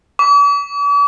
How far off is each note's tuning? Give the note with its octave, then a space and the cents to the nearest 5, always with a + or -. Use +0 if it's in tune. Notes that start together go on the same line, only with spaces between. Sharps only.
D6 -45